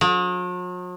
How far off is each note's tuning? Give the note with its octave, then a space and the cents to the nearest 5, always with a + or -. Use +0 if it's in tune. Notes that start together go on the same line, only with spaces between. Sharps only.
F#3 -45